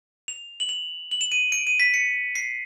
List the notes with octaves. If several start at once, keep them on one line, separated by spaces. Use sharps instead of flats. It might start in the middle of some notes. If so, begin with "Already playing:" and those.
F7
F#7
F7
F#7
E7
D#7
D7
D#7
B6
C#7
C7